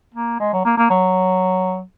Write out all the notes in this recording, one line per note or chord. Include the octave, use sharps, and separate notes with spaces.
A#3
G#3
F#3
A#3
A#3
F#3